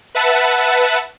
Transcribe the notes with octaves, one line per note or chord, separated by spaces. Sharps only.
B4 E5 F#5 A5